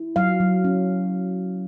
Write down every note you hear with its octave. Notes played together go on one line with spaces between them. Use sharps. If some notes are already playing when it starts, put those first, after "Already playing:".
Already playing: E4
F#3 F5
F#3
C#4